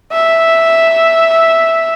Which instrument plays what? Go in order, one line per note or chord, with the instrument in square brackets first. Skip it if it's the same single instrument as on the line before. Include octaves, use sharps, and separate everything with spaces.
[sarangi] E5